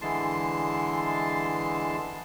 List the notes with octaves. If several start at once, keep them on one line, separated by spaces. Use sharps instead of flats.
D3 E3 G#3 A5 C6